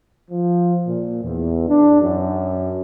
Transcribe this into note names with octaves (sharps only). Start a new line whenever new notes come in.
F3
A#2
E2
D4
F#2